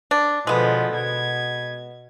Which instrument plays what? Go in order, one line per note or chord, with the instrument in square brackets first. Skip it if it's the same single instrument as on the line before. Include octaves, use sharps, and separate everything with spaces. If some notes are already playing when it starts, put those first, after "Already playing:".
[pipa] D4
[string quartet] B2 D3 F3 [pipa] G#3 B3
[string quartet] B2 G#6